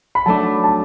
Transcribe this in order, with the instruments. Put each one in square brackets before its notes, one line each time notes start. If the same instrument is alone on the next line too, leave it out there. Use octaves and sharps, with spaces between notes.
[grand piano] B5
[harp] F#3 A3 D4 [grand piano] A5
[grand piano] A5